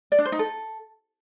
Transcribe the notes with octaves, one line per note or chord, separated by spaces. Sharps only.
D5
D4
C5
D#4
A4